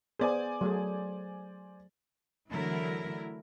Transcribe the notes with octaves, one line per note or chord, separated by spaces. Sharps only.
B3 G#4 C5 D5 G#5
F#3 A3 G#4
D3 E3 F#3 A3 E4 A#4